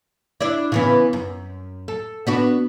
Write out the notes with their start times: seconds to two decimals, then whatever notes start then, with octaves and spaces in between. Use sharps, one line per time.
0.41 D4 E4 D5
0.72 C#3 E3 B3
1.13 F#2
1.88 A4
2.27 B3 D4 F#4